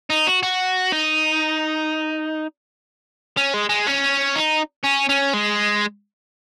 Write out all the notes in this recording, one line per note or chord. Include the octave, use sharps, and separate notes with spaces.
D#4
F#4
F#4
D#4
C#4
G#3
G#3
C#4
D#4
C#4
C#4
G#3